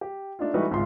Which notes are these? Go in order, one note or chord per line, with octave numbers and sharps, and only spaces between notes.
G4
A3 D4 D#4 F4
E3 G3 A3 D#4 F#4 B4
G#1 C#2 F4 E5 C6